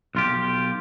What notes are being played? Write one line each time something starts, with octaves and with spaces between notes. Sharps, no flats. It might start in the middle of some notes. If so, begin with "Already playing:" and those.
B1 F4 G4